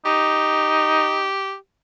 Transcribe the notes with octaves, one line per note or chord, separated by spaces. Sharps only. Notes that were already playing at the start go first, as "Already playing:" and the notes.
D#4 G4